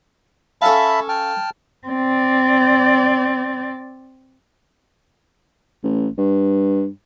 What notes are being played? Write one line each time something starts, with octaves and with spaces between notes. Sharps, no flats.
C#4 A4 E5 F5 A5 B5
G5 A5 F6
C4 D5
A1
G2